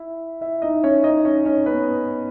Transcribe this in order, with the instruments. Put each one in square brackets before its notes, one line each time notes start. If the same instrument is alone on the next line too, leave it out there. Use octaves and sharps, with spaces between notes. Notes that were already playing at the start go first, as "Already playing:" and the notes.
Already playing: [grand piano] E4 E5
E4 E5
D#4 D#5
C#4 C#5
D#4 D#5
C#4 C#5
C#4 C#5
B3 B4